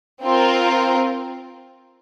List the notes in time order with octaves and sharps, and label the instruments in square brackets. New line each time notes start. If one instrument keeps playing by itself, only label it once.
[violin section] C4 F4 A#4